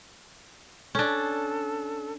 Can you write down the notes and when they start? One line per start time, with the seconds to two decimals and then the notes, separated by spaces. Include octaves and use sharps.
0.95 C#4 D4 A4